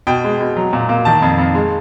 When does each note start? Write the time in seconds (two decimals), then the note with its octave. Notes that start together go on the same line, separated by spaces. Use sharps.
0.07 B2 G5
0.24 G#3
0.41 B2
0.56 F#3
0.73 A#2
0.89 A#3
1.05 D#3 A5
1.22 F2
1.38 F2
1.55 G#3